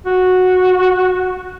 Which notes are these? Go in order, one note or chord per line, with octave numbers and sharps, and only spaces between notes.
F#4